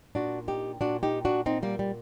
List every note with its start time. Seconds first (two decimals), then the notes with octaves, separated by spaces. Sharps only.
0.15 A#2 D4 F#4
0.48 D#4 G4
0.81 A#2 D4 F#4
1.03 D#4 G4
1.25 D4 F#4
1.46 A#2 C4 D#4
1.63 G3 A#3
1.79 G3